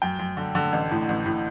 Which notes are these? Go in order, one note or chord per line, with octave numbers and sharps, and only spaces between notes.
F#2 G5
F#2
D3
D3
A1
A2
A1
A2